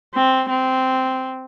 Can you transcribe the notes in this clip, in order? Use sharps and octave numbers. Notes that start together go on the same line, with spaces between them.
C4
C4